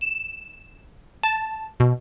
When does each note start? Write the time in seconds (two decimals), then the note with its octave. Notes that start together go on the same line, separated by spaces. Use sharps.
0.01 E7
1.23 A5
1.80 B2